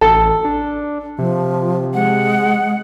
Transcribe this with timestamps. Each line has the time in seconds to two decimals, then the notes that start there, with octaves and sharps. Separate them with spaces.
0.01 A1 A4
0.45 D4
1.19 C3 F3
1.94 G#3 F#5